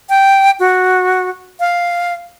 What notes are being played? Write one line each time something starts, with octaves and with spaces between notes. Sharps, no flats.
G5
F#4
F5